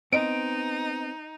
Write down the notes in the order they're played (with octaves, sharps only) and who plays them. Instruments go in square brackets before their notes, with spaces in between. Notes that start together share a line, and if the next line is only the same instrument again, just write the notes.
[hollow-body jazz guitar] B3 C4 [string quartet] D#4 [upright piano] D#5 D7